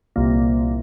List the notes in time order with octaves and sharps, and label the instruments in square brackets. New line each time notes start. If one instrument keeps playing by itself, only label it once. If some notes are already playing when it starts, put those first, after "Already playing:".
[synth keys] C2 A#2